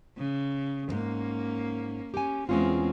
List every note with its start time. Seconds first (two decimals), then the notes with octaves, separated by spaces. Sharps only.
0.18 C#3
0.89 F2 G#2 A#3 C#4
2.14 C#4 G4 G#5
2.49 E2 G#3 C4 C#4 F4